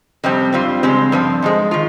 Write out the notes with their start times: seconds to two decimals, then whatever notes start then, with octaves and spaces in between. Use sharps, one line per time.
0.24 F2 C3 G3 C4
0.53 G2 G3 C4 F4
0.83 F2 C#3 G#3 C4 G4
1.12 G2 F3 C4
1.42 G#2 F3 G#3
1.71 D#3 F4